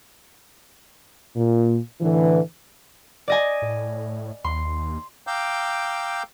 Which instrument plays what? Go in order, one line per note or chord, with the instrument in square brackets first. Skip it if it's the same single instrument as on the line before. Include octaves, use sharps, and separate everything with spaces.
[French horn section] A#2
A2 D3 E3
[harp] D5 D#5 G#5
[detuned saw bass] A2
[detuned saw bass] D#2 [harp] C6
[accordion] F5 G5 A#5 D6 E6 G6